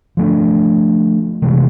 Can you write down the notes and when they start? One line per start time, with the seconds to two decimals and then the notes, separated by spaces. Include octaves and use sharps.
0.17 F3 A3 D4
1.42 C3 E3 G#3